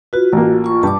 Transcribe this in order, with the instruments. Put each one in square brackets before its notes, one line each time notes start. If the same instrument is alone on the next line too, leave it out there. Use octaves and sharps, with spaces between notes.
[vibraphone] F4 F#4 [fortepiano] B4
[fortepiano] A1 A#3
[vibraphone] F4 C#6
[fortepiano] G2 [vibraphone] A5 D6